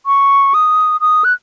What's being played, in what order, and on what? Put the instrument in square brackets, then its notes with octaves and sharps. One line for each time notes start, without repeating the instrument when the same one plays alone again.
[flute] C#6
D#6
D#6
F#6